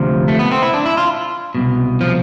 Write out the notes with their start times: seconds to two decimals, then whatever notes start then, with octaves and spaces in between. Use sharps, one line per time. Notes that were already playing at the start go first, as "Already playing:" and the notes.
Already playing: D2 C3 F3
0.28 A3
0.39 B3
0.51 C4
0.62 E4
0.74 D4
0.86 E4
0.97 F4
1.55 C2 B2
2.01 F3